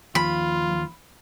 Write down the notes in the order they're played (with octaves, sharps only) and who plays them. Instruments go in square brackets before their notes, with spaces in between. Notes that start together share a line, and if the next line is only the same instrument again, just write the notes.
[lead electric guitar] D#2 F3 [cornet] F4 [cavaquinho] B5